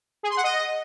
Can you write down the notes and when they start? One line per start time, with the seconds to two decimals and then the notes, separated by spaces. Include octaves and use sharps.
0.23 G#4
0.30 C6
0.37 F#5
0.44 D#5